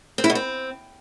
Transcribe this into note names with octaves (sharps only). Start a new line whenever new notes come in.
C4
E4
B2
C4